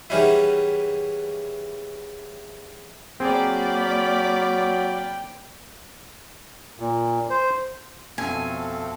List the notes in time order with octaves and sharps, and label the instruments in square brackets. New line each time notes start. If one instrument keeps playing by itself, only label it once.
[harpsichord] E2 E3 G3 C#4 D#4 E4
[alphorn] F#3 [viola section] A#3 D5 B5 [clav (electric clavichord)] C4 G#4 [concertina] G5
[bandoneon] A#2
C5
[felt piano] F2 B2 [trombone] A3 [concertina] C4 A4 F5 [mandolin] G#5